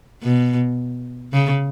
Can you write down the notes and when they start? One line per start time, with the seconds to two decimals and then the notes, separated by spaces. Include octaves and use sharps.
0.23 B2
1.33 C#3